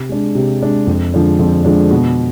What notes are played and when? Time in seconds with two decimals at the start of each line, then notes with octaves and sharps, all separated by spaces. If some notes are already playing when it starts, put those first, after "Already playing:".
Already playing: C3
0.09 G#3 D4
0.35 C3
0.62 G#3 D4
0.87 F2
1.14 D3 F3 G#3 D4
1.39 F2
1.65 D3 F3 G#3 D4
1.91 B2